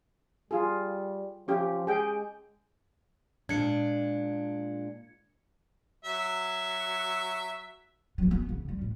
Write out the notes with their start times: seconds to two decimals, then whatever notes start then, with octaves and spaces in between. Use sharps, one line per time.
0.51 G3 F4 G#4
1.48 F3 C#4 G4
1.87 G#3 G#4 G5
3.49 A#2 G#3 D4 G#6 C#7
6.05 F#3 E5
8.18 E2 F#3
8.31 B3
8.49 C#3
8.69 G3
8.81 A2